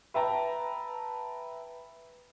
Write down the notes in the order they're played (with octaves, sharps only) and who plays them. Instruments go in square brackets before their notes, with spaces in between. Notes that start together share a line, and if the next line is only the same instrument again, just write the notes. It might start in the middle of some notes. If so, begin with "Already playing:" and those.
[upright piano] B4 E5 G5 A5 A#5